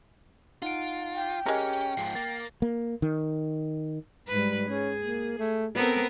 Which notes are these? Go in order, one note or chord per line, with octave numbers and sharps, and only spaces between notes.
D#4 F4 F#5 D7
G5
G#3 C#4 G4 A#4
G#2 F3 C7
A#3 A6
A#3
D#3
G#2 G3 B4
C#4 G#4
A#3
A3
B3 C4 A4 A#4